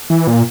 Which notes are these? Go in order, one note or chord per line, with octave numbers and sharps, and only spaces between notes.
E3
A#2